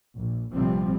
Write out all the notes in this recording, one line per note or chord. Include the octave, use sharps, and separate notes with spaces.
A#1
A#1 C3 F3 G3 C4